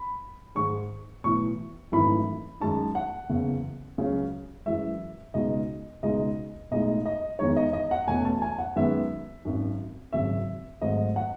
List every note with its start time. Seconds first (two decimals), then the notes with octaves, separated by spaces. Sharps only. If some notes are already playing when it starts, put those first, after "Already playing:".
Already playing: B5
0.55 G#2 D#3 G#3 D#4 C#6
1.24 B1 A2 E3 C#6
1.92 G#1 F#2 E3 A3 D#4 B5
2.60 F#2 D#3 G#3 D#4 A5
2.95 F#5
3.30 F#1 E2 C#3
3.98 C#2 C#3 F#3 C#4
4.66 F#2 E3 G#3 E5
5.34 C#2 B2 G#3 D#4 D#5
6.03 C#2 B2 G#3 D#4 D#5
6.71 B1 A2 G#3 D#4 D#5
7.06 D#5
7.39 E2 D#3 G#3 D#4 C#5
7.56 D#5
7.73 D#5
7.91 F#5
8.08 E1 E2 B2 A3 C#4 G#5
8.25 A5
8.42 G#5
8.58 F#5
8.76 F#2 D#3 G#3 B3 E5
9.45 G#1 F#2 D#3
10.12 G#1 F#2 C#3 F#3 C#4 E5
10.81 G#1 G#2 F#3 A3 D#5
11.16 F#5